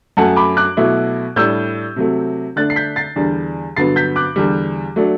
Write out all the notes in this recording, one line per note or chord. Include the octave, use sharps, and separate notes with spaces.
F#2 F#3 A3 F#5 A5
B5 D6
D6 F#6
B2 F#3 A3 E4
A2 G3 D4 E6 G6
C3 F#3 A3
D3 A3 D4 F#6 A6
C7
G6 B6
A6 C7
E2 D3 G3 D4
G2 D3 F#3 B3 A6 C7
G6 B6
D6 F#6
E2 D3 G3
F#3 A3 D4